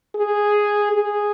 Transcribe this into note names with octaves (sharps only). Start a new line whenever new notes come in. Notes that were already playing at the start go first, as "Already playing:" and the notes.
G#4
G#4